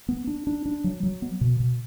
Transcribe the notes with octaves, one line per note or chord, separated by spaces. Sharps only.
B3
D4
D4
D4
F#3
F#3
B3
B2
B2